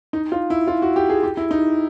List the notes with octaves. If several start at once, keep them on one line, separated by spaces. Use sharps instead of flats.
D#4
F4
E4
F4
F#4
G4
G#4
G4
E4
D#4